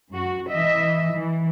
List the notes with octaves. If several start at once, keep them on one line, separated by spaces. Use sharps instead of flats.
F#2 F#4
E3 D#5 E5
E3